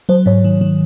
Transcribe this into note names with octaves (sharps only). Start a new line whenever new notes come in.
F#3 C5
G#2 C#5
D#3
D#3